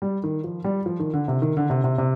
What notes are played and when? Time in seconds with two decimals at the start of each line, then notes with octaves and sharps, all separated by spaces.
0.02 G3
0.24 D#3
0.44 F3
0.64 G3
0.86 F3
0.99 D#3
1.14 D3
1.28 C3
1.42 D#3
1.57 D3
1.70 C3
1.84 C3
1.98 C3